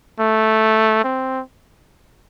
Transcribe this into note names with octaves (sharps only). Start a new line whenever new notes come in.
A3
C4